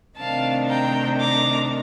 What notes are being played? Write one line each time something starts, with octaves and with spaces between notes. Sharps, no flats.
C3 D#3 A3 D4 F5 A5
G5 A#5
A#5 D6